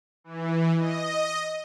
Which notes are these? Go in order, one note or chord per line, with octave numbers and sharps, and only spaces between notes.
E3
D#5